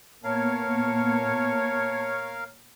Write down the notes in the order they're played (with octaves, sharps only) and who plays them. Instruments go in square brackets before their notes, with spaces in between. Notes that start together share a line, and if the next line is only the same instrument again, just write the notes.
[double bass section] A#2 A#3 B3 [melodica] A#4 F5 [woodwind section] C#5 [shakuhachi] A5